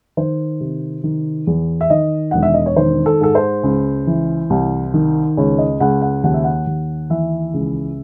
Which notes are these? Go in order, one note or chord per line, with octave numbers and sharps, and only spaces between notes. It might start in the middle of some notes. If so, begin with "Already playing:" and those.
D#3 C5
C3
D#3
E2
E5
D#3 D#5
E1 F#5
E5
D#5
C#5
D#3 C5
A4
G#2 A4
C5
C#2
E3
C2
D#3
C#2 C#5
D#5
C#2 F#5
F#5
D#2 F#5
E5
F#5
D#2
E3 E5
C#2